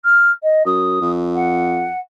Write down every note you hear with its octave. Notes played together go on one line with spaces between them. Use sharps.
F6
D#5
F#2 D#6
F2
F#5